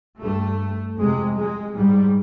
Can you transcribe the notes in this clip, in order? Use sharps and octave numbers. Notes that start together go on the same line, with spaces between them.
G2 A3
F2 C3 G#3
G#3
G#2 G3